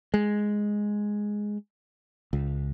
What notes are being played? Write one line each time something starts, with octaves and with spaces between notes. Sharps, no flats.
G#3
C#2